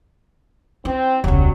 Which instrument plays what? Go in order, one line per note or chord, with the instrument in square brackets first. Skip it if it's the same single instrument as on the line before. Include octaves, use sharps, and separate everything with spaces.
[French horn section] C4 [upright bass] E4
[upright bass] E1 C#2 [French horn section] F#3 G3